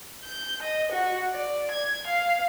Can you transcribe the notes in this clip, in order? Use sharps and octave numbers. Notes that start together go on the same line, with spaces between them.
G6
D#5
F#4
D5
G#6
F5